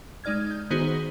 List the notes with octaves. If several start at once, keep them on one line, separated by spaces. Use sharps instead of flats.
G#3 D#4 D5 F6 G#6
G6
D#3 B3 D#4 F#4 G#4 C5